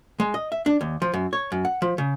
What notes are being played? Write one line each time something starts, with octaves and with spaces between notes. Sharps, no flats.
G#3
D#5
E5
D4
D#2
F3
F#2
C#5
F#2
F#5
F3
C#3